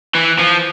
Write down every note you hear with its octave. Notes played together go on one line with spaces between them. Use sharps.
E3
F3